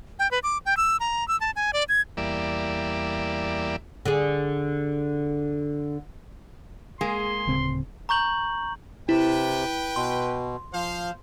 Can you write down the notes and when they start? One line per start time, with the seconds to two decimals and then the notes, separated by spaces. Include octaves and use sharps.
0.19 G5
0.31 B4
0.43 D6
0.66 G5
0.77 E6
1.00 A#5
1.28 E6
1.40 A5
1.56 G#5
1.73 D5
1.89 G#6
2.17 E2 G3 A#3 D5 E5
4.05 D3 G#4
7.01 G#3 A#3 G#4 C6
7.47 D1 C#3 C4
8.09 A#5 C#6 G6 F#7
9.09 C3 E4 B4 G5
9.96 B2 C6
10.73 F3 C5 F5